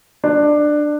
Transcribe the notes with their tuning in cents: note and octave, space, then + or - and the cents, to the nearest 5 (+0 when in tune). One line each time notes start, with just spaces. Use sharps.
D4 +15